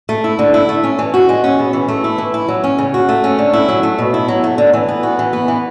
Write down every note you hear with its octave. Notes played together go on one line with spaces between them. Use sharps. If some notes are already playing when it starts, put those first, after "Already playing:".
A3
E4
D3
E4
A3
C#4
E3
F#4
G#3
C#4
B2
E3
A3
E4
E3
E4
F#3
C#4
C#3
F#4
A3
C#4
D3
E4
F#3
A3
B2
E4
F#3
A3
D3
E3
B3
F#4
E3
B3
E3